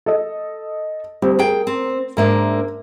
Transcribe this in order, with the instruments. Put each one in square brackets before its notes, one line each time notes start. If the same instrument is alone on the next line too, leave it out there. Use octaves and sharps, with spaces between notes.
[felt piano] A4 D#5
[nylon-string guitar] D2 [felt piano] G3 C4 G4
[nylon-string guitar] G#4 G5 [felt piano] A#4
[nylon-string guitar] C4
[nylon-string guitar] G#2 A#3 D4 [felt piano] A#4 E5